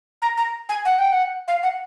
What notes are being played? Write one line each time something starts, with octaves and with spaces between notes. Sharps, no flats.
A#5
A#5
G#5
F#5
G5
F#5
F5
F#5